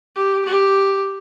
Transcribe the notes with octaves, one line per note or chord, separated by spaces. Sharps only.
G4
G4